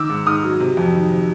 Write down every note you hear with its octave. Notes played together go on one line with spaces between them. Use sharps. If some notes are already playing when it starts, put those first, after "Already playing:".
Already playing: D#3 D6 E6
G#2
G#2 D#6 F6
F#3
C3
F2
D#3
C3